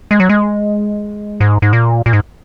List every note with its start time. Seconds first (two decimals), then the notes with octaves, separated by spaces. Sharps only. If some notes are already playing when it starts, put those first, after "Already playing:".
0.11 G#3
0.20 F#3
0.29 G#3
1.40 G#2
1.62 G#2
1.73 A#2
2.06 A#2
2.13 G#2